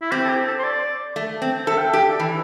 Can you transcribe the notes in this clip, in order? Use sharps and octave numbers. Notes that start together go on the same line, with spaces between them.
E4
C4 G4
A4
G4
A4
C5
D5
A3
C4
A4 E5
G5
G4 E5
D5
E3 E5